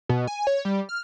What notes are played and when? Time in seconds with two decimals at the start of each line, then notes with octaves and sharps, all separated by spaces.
0.09 B2
0.27 G#5
0.47 C#5
0.65 G3
0.89 F6